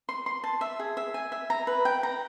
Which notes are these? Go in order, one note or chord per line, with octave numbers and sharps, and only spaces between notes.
C6
C6
A5
E5
G#4
E5
G#5
E5
A#5
B4
G5
A#5